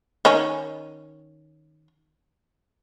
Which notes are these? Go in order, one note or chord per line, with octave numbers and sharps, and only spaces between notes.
D#3 C#4